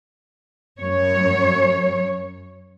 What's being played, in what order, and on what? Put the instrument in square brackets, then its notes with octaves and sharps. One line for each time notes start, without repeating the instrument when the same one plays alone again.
[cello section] F#2 C#5